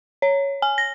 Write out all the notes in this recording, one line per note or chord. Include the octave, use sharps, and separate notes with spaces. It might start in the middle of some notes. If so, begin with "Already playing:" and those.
C#5
G#5
A#6